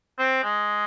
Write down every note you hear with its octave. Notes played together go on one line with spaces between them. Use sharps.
C4
G#3